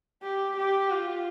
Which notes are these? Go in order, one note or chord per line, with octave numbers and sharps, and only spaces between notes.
G4
G4
F4